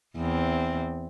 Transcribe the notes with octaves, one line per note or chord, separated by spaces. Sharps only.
E2 C4